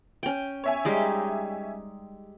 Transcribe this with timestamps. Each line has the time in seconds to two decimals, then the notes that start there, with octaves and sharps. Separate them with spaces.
0.23 C#4 G5
0.64 C#5 E5 G#5
0.85 G3 G#3 D#4